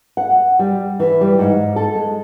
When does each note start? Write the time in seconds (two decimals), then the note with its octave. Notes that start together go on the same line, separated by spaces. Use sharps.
0.17 F#5
0.59 G3
1.00 E3
1.21 G3
1.39 G#2
1.76 A4
1.95 G#3